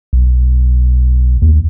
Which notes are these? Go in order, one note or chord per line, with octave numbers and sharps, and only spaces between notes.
B1
D#2